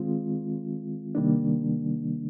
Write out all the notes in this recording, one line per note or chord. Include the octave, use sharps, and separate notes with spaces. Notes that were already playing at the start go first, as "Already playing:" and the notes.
Already playing: D#3 G#3 C4 F4
C3 D#3 G3 A#3 D4